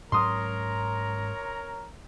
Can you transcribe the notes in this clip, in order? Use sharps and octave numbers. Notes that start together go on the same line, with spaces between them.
G#2 F#3 C#4 A#4 C#5 A#5 C6 D#6